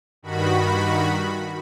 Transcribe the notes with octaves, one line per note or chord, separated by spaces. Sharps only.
G2 D#3 F#4 B5